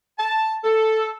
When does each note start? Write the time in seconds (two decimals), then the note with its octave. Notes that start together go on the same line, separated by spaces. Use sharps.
0.19 A5
0.64 A4